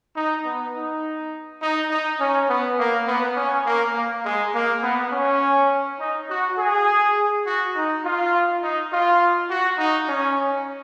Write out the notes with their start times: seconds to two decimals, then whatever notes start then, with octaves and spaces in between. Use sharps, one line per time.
0.16 D#4
0.45 B3
0.75 D#4
1.62 D#4
1.91 D#4
2.20 C#4
2.49 B3
2.79 A#3
3.08 B3
3.37 C#4
3.66 A#3
3.95 A#3
4.25 G#3
4.54 A#3
4.83 B3
5.12 C#4
6.00 D#4
6.30 F#4
6.58 G#4
7.46 F#4
7.75 D#4
8.04 F4
8.63 D#4
8.92 F4
9.50 F#4
9.79 D#4
10.09 C#4